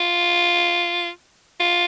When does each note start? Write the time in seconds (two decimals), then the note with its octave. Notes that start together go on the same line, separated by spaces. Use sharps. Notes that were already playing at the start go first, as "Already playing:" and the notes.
Already playing: F4
1.60 F4